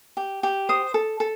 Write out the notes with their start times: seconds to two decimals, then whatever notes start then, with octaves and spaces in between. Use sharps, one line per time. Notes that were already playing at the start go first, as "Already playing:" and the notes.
0.17 G4
0.43 G4
0.69 C5 D#6
0.94 A4
1.20 A4